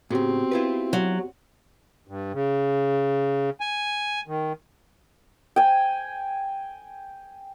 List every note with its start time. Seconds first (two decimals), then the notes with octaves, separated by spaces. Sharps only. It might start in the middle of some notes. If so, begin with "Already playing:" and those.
0.10 A2 C#3 B3 C4 F#4 G4
0.51 E4 F4 B4
0.93 F#3
2.08 G2
2.33 C#3
3.61 G#5
4.27 D#3
5.56 G5 G#5